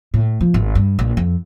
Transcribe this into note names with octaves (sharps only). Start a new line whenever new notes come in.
A2
F3
G#1
G2
A#1
F2